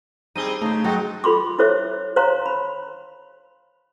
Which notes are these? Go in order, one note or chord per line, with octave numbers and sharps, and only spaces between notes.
G3 C4 D#4 G#4 D#7 G7
C#3 A3 D#4 C5
F#3 G#3 F#4 A4 D#5 G5
F4 A4 B5 C6 D6
E4 A4 C5 C#5 E5 D6
C5 C#5 F5 A#5 C6
B5